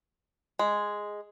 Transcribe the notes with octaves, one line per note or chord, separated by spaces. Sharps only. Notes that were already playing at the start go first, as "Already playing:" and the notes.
G#3